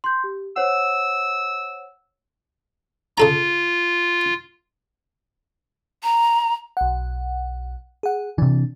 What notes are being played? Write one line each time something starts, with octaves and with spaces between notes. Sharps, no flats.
C6 G6
G4
C5 C#5 F#5 E6
C#3 F4 A4 A#5
A#5
B1 F#5
G#4 F#5
C3 E3 D4